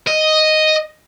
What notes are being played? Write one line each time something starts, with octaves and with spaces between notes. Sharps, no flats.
D#5